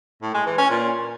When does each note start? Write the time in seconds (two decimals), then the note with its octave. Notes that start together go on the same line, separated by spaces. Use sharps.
0.22 A2
0.34 G#3
0.46 E3
0.58 C#4
0.70 A#2